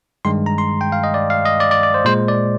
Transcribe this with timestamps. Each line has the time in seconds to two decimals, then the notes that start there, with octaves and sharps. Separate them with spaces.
0.25 G2 D#3 G#3 C6
0.46 A#5
0.58 C6
0.81 G5
0.92 F5
1.04 D#5
1.14 D5
1.30 F5
1.46 D#5
1.60 D5
1.71 D5
1.83 D5
1.94 C5
2.05 A#2 G#3 C5
2.28 D5